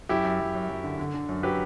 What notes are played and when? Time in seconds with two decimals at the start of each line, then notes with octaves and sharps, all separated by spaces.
0.09 F#2 E4 G4
0.25 F#2
0.40 F#2
0.55 F#2
0.69 F#2
0.84 D3
0.99 D3
1.14 D3
1.29 F#2
1.43 F#3 G4 B4